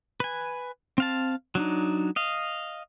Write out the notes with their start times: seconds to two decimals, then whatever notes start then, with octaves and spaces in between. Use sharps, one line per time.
0.20 B4 G#5
0.98 C4 F5 A5
1.55 F#3 D4 D#4
2.16 D#5 F5